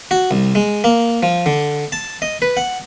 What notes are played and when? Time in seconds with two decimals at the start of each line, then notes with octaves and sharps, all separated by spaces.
0.11 F#4
0.31 C2
0.55 G#3
0.84 A#3
1.23 F3
1.46 D3
1.92 A5
2.22 D#5
2.42 B4
2.57 F#5